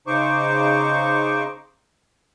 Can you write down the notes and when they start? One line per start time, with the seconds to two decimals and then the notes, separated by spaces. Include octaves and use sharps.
0.07 C#3 D#4 C5 C#6 D6